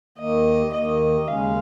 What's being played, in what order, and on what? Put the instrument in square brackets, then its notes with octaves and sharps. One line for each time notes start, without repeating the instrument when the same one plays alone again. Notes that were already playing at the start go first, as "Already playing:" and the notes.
[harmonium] D#2 D#3 A#3 [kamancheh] D#5
[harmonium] D#2 D#3 A#3 [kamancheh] D#5
[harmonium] D#2 C#3 G#3 C#4 [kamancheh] F5